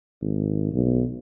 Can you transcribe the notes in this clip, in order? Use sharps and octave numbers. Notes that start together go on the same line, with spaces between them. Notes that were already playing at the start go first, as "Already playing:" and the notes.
G#1
B1